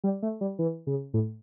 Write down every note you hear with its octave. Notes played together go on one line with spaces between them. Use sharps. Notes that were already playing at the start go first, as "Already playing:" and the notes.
G3
A3
G3
E3
C#3
A2